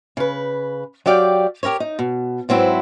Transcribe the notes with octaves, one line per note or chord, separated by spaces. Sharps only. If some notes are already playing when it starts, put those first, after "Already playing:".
C#3 B4
F#3 G4 D5 F5 G5
G4 A#4 B4 C#5
D#4
B2
G#2 F#3 C4 E4 B4